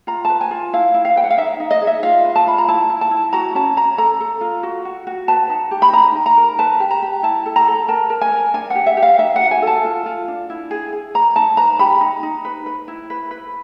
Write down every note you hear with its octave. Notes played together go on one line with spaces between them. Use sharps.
F4 A#5
B4 A5
G#5
F4
E4 F5
E4
F5
B4 G5
F#5
F5
D#4 E5
D#4
D#5
G#4
E5
F4 F5
B4
A5
F4 B5
A#5
E4 A5
E4
A5
E4
F#4 A#5
C#4 A5
C#4 A#5
A4 A#5
A4
F4
F#4
F#4
F#4
B4 A5
D#4
G4
B5
D#4 A#5
D#4
A#5
A#4
B4 A5
G4
A#5
G4
E4 A5
A4
A#5
A4
A#4 A5
A#4
G#5
A#4
D4 G#5
G4 F#5
E5
G4
F5
D#4 E5
F#5
F#4
G#5
A4
A5
F4
F4
D4
E4
G#4
G#4
B4 A#5
D#4 A5
B4 A#5
G4 B5
D#4
D#4
B4
B4
E4
B4
B4